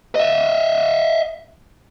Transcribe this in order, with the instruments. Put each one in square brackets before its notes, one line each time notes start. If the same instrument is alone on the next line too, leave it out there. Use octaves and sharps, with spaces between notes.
[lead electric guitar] D#5 E5